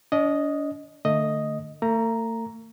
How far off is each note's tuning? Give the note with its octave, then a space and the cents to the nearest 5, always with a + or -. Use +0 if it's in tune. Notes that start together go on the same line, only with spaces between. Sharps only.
D4 -40 D#5 +0
D3 +35 A3 +20 D#5 +0
A3 +45 A#5 +0